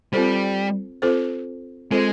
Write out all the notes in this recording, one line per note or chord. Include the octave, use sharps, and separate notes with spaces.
G3 C4 F4 A4 C5
C4 F4 A4 C5
G#3 C4 F4 A4 C5